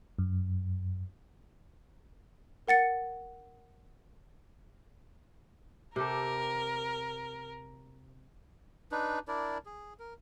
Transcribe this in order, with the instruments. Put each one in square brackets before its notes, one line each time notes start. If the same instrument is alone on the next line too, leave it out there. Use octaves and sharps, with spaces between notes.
[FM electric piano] F#2
[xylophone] A#4 F#5 A6 C#7
[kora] C3 G4 A4 [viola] A#4
[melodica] D4 D#4 B4
D4 E4 A#4 D5
G#4
A#4